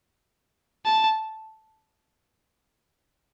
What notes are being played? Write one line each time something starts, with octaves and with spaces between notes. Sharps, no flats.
A5